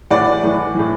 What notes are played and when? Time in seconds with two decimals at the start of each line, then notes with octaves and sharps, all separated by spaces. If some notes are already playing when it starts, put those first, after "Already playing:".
0.10 A2 E3 D5 F#5
0.43 A2 E3
0.75 A2 E3